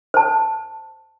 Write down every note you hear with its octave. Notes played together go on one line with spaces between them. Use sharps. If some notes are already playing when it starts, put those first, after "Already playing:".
C5 A5